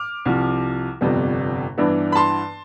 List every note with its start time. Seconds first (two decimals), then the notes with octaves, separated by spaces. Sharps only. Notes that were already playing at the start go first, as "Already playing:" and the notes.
Already playing: D6 F6
0.25 C2 C3 F3
1.01 G1 F2 C3 G3 B3
1.78 G2 E3 B3 D4
2.12 B5
2.15 A5 C6